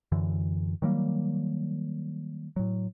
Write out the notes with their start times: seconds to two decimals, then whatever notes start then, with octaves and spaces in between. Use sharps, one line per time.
0.12 F#2 D3 E3
0.82 D#3 F#3 G3 A#3
2.56 A2 F#3